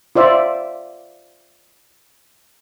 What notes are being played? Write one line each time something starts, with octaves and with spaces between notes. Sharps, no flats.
F4 C5 D5 E5